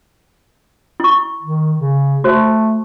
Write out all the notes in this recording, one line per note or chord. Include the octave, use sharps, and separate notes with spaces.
E4 C#6
D#3
C#3
A3 F#4 C5